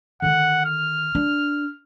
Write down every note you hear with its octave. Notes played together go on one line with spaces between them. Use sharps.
D3 D#3 F#5
F6
D4